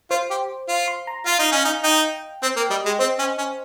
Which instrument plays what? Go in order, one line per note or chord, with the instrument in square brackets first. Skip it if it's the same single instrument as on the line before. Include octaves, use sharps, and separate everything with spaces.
[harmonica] F4 [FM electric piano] C5
[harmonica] G4
F4
[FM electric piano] C6
A#5
[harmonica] F4 [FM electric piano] F5
[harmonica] D#4
[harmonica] C#4 [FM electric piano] D#5
[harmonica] D#4
[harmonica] D#4 [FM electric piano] G5
[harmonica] C4 [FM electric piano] G5
[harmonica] A#3
[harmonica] G3 [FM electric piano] D#5
[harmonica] G#3
[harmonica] C4 [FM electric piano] C5
[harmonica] C#4
C#4